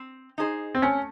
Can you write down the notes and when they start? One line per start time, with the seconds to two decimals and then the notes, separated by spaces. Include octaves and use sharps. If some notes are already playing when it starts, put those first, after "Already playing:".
Already playing: C4
0.38 D#4 G#4 C5
0.75 C4
0.82 A3 C#4